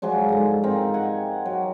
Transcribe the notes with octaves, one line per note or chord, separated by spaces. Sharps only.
F3 F#3 G#3 D4
G#2 D3
C4 D#4 F4 A#4
G4 F#5 G#5
F#3